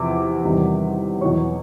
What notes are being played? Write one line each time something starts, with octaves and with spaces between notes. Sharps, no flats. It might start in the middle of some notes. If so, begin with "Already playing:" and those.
Already playing: E2 C3 F3 D6
E2 C3 D#3 G3
E2 B2 F#3 C#5 C#6